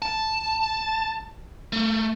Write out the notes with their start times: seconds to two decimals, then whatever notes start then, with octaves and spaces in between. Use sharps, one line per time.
0.02 A5
1.73 A3